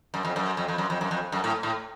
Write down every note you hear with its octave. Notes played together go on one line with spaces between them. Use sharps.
F#2
F2
F#2
F2
F2
F#2
F2
F#2
F2
F#2
A2
A2